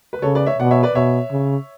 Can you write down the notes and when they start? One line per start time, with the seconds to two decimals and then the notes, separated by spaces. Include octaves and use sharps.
0.13 B4
0.22 C#3 A4 C#5
0.35 B4 D5
0.46 C#5 E5
0.59 B2 D5 F#5
0.71 C#5 E5
0.83 B4 D5
0.95 B2 C#5 E5
1.31 C#3